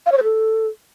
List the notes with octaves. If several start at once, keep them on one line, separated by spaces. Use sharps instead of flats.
F5
C#5
C5
A4